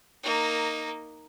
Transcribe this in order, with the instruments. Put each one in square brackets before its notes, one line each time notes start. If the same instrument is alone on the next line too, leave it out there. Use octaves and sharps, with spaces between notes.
[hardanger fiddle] A#3 D#4